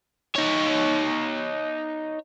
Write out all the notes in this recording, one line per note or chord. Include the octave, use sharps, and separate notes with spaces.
D#4 C#5